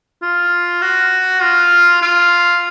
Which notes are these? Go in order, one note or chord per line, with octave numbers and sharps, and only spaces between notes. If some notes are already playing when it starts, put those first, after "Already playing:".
F4
F#4
F4
F4